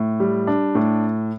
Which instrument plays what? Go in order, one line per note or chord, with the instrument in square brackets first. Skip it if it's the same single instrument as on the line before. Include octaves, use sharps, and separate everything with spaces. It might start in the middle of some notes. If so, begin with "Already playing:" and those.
Already playing: [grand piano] A2
G3
D4
A2